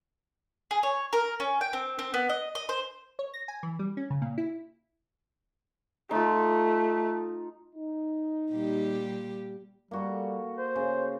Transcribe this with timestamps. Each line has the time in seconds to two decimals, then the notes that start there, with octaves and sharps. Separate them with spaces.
0.71 G#4
0.83 C#5
1.13 A#4
1.40 C#4
1.61 G5
1.73 C4
1.99 C4
2.14 B3
2.29 D#5
2.55 D#5
2.69 C5
3.19 C#5
3.34 A#6
3.48 G#5
3.63 E3
3.79 G3
3.97 C#4
4.10 C#3
4.22 A#2
4.38 E4
6.11 A3 D#4 F4
7.75 D#4
8.52 A#2 G3 G4
9.91 G3 A#3 F#4 A4
10.58 C5
10.75 C#3